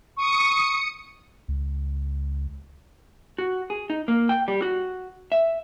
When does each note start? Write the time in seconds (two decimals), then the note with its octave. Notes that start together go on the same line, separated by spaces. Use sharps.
0.17 C#6 D#6 C#7
1.48 C#2
3.38 F#4
3.70 G#4
3.90 D#4
4.08 A#3
4.29 G5
4.48 G3
4.62 F#4
5.32 E5